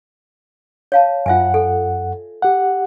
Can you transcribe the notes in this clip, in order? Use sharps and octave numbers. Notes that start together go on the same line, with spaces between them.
C#5 F5 A5
F#2 F4 E5 F#5 G#5
A4
G4 F#5